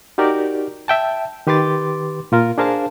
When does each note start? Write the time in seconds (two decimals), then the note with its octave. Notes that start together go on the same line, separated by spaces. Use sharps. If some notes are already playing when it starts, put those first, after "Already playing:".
0.18 D#4 F#4 G4 A#4 D5
0.88 E5 G5 A5
1.47 D#3 G4 B4 C6 D6 A6
2.32 A#2 F4 A#4
2.58 D4 G#4 A#4 C5 F5 A5